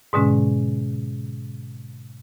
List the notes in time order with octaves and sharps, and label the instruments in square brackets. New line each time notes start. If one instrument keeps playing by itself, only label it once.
[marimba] G#2 B2 D3 G#3 C#4